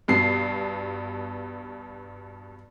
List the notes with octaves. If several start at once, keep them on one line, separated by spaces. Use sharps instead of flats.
G2 B2 C7